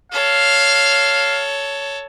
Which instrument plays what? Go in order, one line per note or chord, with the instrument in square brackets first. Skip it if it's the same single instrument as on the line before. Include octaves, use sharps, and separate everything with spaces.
[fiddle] A4 C#5 [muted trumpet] F5